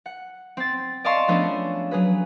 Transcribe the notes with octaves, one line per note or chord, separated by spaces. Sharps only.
F#5
C4 A6
D5 D#5 F5 A5 C6 C#6
F3 A3 B3 C#4 D4 G#4
F#3 G#4 B4